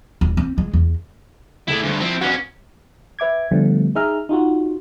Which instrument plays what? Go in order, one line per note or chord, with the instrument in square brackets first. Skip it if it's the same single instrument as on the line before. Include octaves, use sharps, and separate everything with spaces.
[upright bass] D#1
C4
G#3
E2
[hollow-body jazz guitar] C#2 A3 [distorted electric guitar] E4 D5
[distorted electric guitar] D2 G2
[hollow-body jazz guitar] F3 [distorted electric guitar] C4 E4
[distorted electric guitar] F2 C#4 [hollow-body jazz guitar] B3 D4 F#4
[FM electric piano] B4 E5 D6 G#6
D3 F3 G3 A3 B3
D#4 G#4 E5 A#5 F6
D#4 F4 F#4